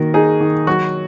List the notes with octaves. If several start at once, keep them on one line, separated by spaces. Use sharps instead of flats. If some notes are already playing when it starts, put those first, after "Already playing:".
Already playing: D#3 A#3 F#4 A#4
D#4 G#4
D#3
F#3 F#4